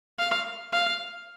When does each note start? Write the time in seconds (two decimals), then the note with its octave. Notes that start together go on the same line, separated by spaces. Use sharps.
0.19 F5
0.73 F5